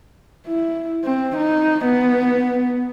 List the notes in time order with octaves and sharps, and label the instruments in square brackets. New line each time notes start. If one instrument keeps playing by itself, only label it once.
[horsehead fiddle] E4
C4
D#4
B3